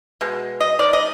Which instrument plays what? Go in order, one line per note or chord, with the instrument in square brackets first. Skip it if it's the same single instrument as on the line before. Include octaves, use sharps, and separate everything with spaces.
[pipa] B2 G#3
D#5
D#3 G#3 D5
D#5